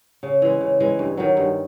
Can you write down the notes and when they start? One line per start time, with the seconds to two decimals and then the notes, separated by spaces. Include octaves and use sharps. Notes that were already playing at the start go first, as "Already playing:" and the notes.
0.23 C#3
0.42 E3 G#3
0.61 C#3
0.80 E3 G#3
0.99 G2
1.17 D#3 F#3
1.37 G2